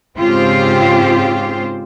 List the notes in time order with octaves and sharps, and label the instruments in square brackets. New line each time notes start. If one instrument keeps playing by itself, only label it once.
[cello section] G#2 C#3 C4 F4 G4 C5